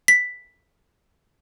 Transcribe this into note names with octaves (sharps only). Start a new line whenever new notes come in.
B6